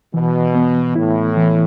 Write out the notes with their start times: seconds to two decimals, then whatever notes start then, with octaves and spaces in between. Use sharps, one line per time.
0.14 B2 E3
0.55 B3
0.96 A2 E4
1.37 E3